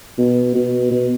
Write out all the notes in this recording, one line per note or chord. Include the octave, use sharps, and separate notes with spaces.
B2
B2
B2